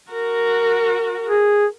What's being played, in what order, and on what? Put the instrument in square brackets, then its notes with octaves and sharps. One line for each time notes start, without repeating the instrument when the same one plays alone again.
[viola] F#4 A#4
[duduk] G#4